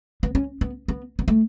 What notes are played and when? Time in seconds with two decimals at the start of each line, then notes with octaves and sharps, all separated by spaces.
0.23 B3
0.35 C#4
0.61 B3
0.88 B3
1.19 B3
1.28 A3